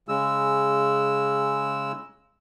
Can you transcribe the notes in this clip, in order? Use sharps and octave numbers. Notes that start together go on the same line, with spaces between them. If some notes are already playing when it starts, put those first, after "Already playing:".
C#3 G#3 E6